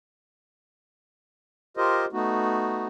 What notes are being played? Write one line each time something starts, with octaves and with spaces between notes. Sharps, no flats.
F4 G4 A#4 C5 D#5
A3 B3 D#4 F#4